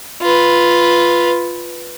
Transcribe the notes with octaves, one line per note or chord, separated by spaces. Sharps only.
F4 B4